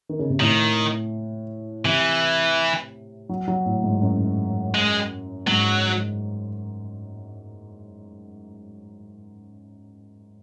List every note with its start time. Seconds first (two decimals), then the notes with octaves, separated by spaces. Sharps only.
0.09 D#3
0.19 C#3
0.30 C3
0.40 A2 D#3
1.84 C3 E3
3.29 F#3
3.48 F#3
3.66 A2
3.84 G#2
4.02 F#2
4.75 G#3
5.47 G#2 F#3